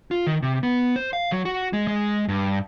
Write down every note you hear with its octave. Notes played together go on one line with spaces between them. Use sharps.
F4
D#3
C3
B3
C5
F5
F#3
F#4
G#3
G#3
G2